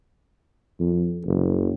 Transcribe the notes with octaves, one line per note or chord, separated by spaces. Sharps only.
F2
F#1